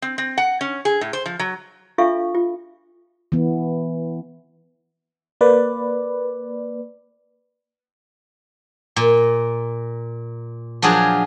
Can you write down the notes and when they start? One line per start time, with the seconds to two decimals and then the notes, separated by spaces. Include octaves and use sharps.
0.02 C4
0.18 C4
0.38 F#5
0.61 C#4
0.85 G#4
1.01 A2
1.13 C5
1.26 F3
1.39 F#3
1.98 D4 F4 A4 E5 F5 C#6
2.35 F4
3.32 E3 B3
5.41 A#3 B4 D5
8.96 A#2
10.82 F3 F#3 D4 F4 G#4